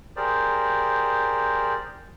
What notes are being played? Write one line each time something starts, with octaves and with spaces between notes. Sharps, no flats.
G4 G#4 A#4 C5 D5